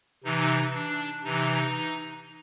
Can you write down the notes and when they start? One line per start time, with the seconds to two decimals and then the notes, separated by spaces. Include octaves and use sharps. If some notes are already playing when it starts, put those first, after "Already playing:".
0.24 C3 E3 D#4
0.75 D4
1.24 C3 E3 D#4